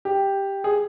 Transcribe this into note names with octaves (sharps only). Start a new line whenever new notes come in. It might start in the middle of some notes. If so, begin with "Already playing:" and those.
G4
G#4